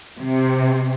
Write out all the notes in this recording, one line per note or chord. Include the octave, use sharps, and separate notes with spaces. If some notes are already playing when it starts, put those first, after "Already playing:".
C3